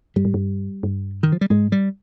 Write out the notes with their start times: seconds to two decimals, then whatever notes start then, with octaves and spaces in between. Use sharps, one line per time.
0.16 G2 G3
0.25 G#2
0.34 G2
0.83 G2
1.23 D#3
1.32 F3
1.41 G3
1.50 G#2 G#3
1.72 G3